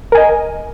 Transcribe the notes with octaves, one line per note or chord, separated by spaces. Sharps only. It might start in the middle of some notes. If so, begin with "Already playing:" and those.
A#4 D#5 G#5